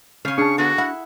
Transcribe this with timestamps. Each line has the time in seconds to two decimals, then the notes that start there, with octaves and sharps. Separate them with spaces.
0.25 C#3 C#4 F5
0.38 D4 G#4 A5 C#6
0.58 D3 B3 F#4
0.78 E4 F#5